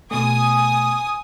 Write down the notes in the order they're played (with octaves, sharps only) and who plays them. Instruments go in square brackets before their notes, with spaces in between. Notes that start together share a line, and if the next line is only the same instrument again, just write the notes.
[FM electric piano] B2 A3 [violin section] G#5 D#6